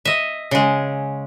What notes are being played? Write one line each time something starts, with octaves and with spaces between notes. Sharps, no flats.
D#5 E5
C#3 G#3